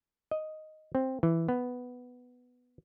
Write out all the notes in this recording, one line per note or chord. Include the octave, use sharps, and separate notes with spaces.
D#5
C4
E3
B3